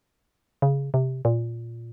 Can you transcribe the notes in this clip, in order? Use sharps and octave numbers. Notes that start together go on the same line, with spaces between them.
C#3
C3
A#2